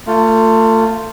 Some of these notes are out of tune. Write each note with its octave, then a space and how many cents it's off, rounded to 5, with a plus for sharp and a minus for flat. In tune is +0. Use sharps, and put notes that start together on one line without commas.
A3 +30 F4 +0